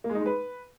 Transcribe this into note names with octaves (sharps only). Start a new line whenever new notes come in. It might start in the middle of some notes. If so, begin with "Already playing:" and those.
A#3
G#3
D#4
G#3
B4